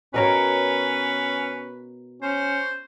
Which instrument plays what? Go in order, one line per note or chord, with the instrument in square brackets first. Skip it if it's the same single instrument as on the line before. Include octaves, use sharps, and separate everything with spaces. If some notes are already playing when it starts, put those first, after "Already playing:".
[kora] B2 A#4 C#5 [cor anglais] C#4 [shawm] B4
[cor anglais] C#4 [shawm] C5